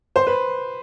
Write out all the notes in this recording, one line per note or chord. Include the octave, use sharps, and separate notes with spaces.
C5
B4